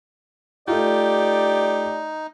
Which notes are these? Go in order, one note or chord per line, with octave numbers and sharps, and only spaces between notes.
A3 D#4 F4 G4 D5